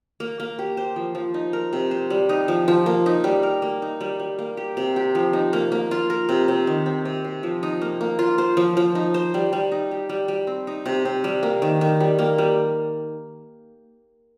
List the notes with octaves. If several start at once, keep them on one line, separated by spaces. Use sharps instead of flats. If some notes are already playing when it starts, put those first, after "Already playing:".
A#3
A#3
G4
C5
F3
F3
D#4
A#4
C3
C5
G3
D#4
F3
F3
A#3
D#4
G3
A#4
A#3
D#4
G3
G3
A#3
G4
C3
G4
F3
D#4
A#3
A#3
F4
A#4
C3
C3
D#3
C4
C3
C3
F3
D#4
A#3
A#3
F4
C5
F3
F3
D#4
C5
G3
G3
D#4
G4
G3
G3
C4
D#4
C3
C3
G3
A#3
D#3
D#3
G3
A#3
G3